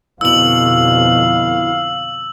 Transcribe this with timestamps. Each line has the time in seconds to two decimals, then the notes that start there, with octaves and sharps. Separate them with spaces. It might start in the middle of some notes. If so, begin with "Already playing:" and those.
0.21 F2 B2 D3 E4 F5 E6 F#7